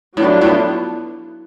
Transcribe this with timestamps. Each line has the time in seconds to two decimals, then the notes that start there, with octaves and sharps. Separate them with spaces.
0.17 A2 F#3 B3 D4 F4
0.41 A2